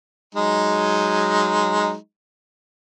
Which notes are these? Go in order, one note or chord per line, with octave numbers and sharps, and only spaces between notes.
F#3 G#3 D#4